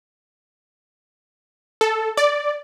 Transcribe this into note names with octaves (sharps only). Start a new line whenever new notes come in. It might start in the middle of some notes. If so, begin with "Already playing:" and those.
A4
D5